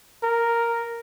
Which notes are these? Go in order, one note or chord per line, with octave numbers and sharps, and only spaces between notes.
A#4